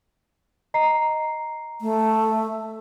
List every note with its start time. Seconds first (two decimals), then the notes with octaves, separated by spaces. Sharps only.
0.74 D#5 A#5 C7
1.81 A3